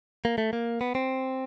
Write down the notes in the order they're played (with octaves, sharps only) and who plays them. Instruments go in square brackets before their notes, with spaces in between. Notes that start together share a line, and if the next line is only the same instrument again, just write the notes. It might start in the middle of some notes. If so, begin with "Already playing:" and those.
[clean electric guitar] A#3
A3
A#3
B3
C4